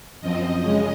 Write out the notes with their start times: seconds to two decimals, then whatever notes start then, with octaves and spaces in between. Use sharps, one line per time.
0.21 F#2 F3 C4 D#5
0.62 C#3 G#3 C#4